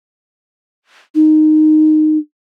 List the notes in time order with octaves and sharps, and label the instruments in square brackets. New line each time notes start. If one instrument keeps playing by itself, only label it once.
[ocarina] D#4